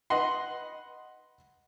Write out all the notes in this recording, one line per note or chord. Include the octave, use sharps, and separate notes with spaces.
B4 D#5 F#5 C6